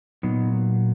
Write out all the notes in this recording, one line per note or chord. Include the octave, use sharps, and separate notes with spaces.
A#2 F#3 B3 D#4